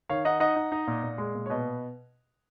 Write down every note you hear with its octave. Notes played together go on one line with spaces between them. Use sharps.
D#3 C#5 F5
D#4 D#5 F#5
D#4 D#5 F#5
D#4
D#4
A#2
A#2
G#3
A#2
C#5
B2 B4 D#5